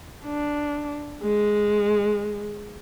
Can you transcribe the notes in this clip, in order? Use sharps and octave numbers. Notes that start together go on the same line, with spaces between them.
D4
G#3